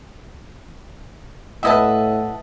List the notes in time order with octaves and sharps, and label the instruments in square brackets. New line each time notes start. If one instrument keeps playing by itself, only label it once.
[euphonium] A2 [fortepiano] B4 D#5 E5 [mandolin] F#5 G#5 A5